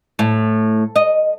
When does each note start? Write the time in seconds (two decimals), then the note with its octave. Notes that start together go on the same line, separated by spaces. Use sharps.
0.19 A2
0.96 D#5